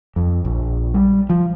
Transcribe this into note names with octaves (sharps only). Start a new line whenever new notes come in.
F2
A#1
G3
F3